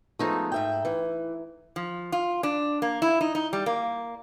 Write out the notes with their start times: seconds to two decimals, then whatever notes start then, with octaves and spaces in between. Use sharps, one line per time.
0.19 F3 G#3 A3 B3 D#4
0.52 G#2 E5 G5
0.85 E3
1.76 F3
2.12 F4
2.43 D4
2.82 A#3
3.02 E4
3.21 D#4
3.35 D#4
3.53 G3
3.66 A#3